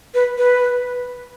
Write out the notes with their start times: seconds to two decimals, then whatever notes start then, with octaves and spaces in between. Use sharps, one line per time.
0.14 B4
0.38 B4